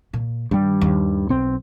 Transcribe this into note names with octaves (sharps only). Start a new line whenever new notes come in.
A#2
G2 D#3 G3
D#2
B1 C4